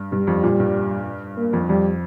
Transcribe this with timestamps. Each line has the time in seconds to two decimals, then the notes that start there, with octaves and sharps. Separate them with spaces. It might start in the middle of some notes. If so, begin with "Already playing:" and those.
Already playing: G2
0.12 G2 G3
0.27 F2
0.43 A#2
0.60 G2
1.37 A#3
1.53 F2
1.69 F2 G3